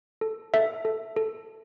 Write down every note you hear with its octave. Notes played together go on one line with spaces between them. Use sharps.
A4
A4 E5
A4
A4